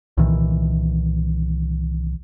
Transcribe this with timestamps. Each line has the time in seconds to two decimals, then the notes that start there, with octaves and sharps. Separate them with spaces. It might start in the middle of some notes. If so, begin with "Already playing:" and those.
0.17 C2 A#2 D#3 E3